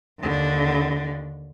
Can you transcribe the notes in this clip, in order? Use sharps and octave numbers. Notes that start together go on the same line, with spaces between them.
D#2 D3